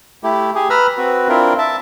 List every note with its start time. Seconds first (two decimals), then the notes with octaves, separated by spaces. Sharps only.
0.23 A3 E4 G4
0.55 G4 G#4
0.70 B4 A#5 B5 E6 F6
0.98 C4 F#4 B4
1.29 C4 D4 E4 F4 A#4
1.58 E5 A5